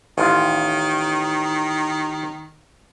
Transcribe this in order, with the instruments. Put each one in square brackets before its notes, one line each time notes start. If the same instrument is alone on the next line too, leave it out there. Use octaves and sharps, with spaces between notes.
[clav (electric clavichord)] A1 F4 [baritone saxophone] D#3